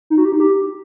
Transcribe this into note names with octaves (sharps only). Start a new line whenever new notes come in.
D#4
F#4
G4
D#4
G4